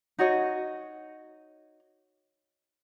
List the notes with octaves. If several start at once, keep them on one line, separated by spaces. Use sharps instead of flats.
D#4 F#4 C#5 D#5